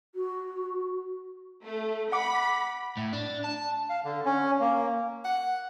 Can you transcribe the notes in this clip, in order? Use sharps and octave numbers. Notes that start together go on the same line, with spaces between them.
F#4
A3
F#5 B5 D6
A2
D4
A5
F5
D3
C#4
A#3
F#5